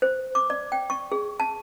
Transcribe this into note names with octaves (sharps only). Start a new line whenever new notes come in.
C5
D6
D5
G5
C#6
G#4
A5